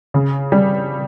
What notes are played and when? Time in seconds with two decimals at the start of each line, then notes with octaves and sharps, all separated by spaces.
0.14 C#3
0.52 G3